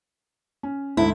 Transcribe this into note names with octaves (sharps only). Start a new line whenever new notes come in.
C#4
D2 G#2 E4